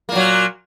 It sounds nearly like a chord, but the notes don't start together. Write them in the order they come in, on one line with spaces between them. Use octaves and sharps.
A#3 A#2 F#3